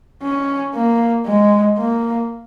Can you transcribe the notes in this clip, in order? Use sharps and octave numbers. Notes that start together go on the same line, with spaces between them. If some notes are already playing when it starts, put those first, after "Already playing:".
C#4
A#3
G#3
A#3